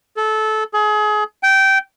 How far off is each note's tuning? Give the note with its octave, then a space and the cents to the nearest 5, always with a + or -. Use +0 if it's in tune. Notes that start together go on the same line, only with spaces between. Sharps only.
A4 -20
G#4 +30
G5 -15